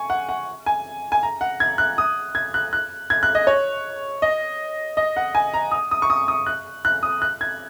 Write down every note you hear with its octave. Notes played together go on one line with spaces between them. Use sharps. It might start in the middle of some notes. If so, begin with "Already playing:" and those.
Already playing: G#5 C#6
F#5
F#5
G#5
G#5
A#5
F#5
G#6
F#6
D#6
G#6
F#6
F#6
G#6
F#6
D#5
C#5
D#5
D#5
F#5
G#5
A#5
D#6
D#6
C#6
D#6
D#6
F#6
F#6
D#6
F#6
G#6